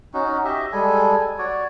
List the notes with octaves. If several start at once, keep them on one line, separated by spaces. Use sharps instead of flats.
C#4 D#4 F#4
G4 D#5 E5
G3 G#3 A4 G#5
F#4 C#5 D5